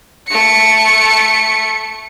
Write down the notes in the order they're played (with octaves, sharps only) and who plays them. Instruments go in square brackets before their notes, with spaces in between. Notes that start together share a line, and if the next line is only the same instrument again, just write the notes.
[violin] A3 C#7